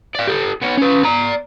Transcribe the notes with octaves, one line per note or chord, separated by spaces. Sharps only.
D5 F5
G4 A4
B3 C#5
C#4 B4
D5 A#5